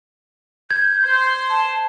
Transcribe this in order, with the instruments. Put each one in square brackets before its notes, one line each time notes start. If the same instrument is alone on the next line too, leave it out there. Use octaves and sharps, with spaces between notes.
[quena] G6 [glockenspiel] G#6
[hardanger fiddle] C5 C6
[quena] A5